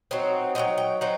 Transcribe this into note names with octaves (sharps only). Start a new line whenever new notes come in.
F#3 C4 D#4
F#3 C4 D#4 G5
G5
F#3 C4 D#4 F#5